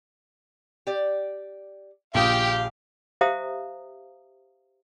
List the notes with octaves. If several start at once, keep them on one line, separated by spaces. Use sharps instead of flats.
G4 D5
A#1 C#3 F4 G4 F5 G5 D#6
G4 C5 E5 F5 A#5 D#6